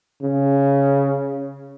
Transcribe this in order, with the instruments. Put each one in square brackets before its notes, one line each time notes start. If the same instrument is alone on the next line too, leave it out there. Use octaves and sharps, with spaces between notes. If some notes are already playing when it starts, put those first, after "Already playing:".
[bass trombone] C#3